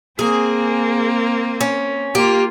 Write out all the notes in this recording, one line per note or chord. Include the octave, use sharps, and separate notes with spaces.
A#3 C4 G#4
C#4
A#3 F4 G4